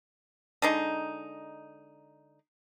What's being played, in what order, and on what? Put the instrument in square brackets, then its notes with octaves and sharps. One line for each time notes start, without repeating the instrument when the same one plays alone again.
[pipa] D3 G#3 D#4